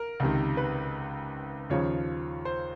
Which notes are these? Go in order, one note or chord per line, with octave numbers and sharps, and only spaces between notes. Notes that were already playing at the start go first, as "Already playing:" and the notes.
Already playing: A#4
C#2 C3 D#3
B4
D#2 C#3 F3 C#5
C5